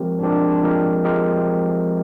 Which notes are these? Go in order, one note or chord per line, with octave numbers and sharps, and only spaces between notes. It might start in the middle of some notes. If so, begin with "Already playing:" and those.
Already playing: F3 G#3 C4 G4 A#4
F3 G#3 C4 D4 G4 A#4
F3 G#3 C4 G4 A#4
F3 G#3 C4 G4 A#4